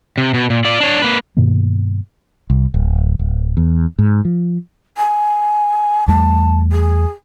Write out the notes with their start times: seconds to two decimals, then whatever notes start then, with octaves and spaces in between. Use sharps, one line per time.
0.18 C3
0.34 B2
0.50 A#2
0.65 F4 D5
0.80 D4 C#5
1.02 A#3 B4
1.37 G2 B2 D#3 A#3
2.50 C2
2.74 D1
3.19 D1
3.57 E2
3.99 G#2
4.25 F3
4.97 G#5
6.08 E2 G3 A3 A5
6.72 G#4